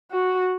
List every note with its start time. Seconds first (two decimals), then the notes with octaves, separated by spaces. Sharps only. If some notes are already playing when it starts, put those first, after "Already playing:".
0.12 F#4